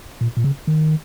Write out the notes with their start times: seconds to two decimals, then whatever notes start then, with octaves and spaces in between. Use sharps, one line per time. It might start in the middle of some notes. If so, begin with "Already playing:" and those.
0.21 A#2
0.37 A#2
0.44 C#3
0.67 D#3